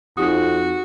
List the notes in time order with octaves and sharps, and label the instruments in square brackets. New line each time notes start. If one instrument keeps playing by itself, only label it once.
[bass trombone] F2 [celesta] D#4 G4 D#6 [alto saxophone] F#4